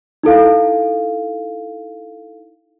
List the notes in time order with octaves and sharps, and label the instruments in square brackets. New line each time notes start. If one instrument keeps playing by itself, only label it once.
[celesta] D#4 E4 A4 F5